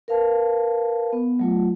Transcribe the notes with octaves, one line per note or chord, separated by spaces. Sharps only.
A#4 B4 F5 A5
B3
F#3 A3 F4